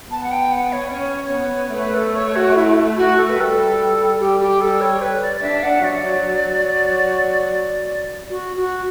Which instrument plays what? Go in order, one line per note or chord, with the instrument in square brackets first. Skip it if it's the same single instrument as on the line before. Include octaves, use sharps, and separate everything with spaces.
[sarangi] B3 [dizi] A5
[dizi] F#5
G5
F#5
C#5
[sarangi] C#4 [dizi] C#5
[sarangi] B3
[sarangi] A3 [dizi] B4
[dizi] A4
C#5
F#4
E4
F#4
A4
B4
[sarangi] G3 [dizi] A4
[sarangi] G3 [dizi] G4
[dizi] G4
[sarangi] G3 [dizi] A4
[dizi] C#5
B4
D5
D5
[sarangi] D4 [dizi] E5
[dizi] F#5
[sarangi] F#3 [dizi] D5
[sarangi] F#3
[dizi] F#4
F#4